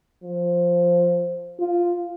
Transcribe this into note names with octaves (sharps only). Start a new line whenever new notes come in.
F3
F4